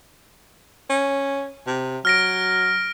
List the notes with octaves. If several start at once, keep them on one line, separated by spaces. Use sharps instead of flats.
C#4
C3
F#3 F6 A#6 D7